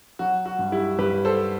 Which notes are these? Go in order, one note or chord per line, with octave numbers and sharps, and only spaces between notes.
F#3 F#4
F#4
G2
E4 G4
G2 G4 B4
A4 C5